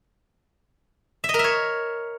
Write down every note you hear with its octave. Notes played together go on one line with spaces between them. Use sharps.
E5
D#5
A#4
E5
C#5